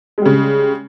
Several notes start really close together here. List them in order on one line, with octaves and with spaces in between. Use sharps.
G#3 G3 C#3